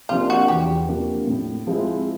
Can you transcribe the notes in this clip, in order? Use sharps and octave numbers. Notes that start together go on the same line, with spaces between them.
C3 F3 A#3 D4 F4
F#4
E2 G4
C3 F3 A#3 D4
A2
F3 G#3 C4 E4